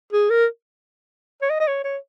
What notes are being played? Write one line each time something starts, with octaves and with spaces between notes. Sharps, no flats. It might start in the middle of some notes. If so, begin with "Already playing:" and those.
G#4
A#4
C#5
D#5
D#5
C#5
C#5